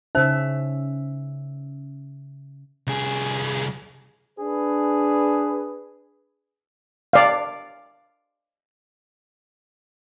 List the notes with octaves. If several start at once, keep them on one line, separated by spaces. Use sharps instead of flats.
C#3 C#4 D#4 C5 E5
C2 G#4
D4 G#4 B4
D5 F5